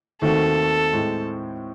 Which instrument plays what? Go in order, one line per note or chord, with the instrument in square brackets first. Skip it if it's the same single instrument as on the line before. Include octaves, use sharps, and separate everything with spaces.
[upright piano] D#2 D#3 A3 C4 F#4 [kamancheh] A4
[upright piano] A2 G#3 C4